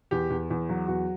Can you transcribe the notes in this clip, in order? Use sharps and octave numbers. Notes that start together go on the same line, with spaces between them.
E2 G4
E2
E2
F#3
E2 F#4